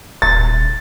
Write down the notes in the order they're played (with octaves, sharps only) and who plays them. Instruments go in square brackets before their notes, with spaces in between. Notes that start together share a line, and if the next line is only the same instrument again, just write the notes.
[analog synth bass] D#1 [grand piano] A6